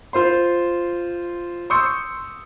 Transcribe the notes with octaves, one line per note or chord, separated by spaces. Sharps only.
F4 C5 C6
C6 C#6 D#6 E6 G6 C#7